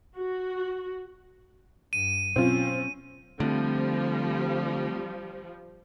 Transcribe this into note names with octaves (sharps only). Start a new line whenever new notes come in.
F#4
G2 D#7
B2 F#3 C4 C#4 F4
D3 F3 G3 A3 C4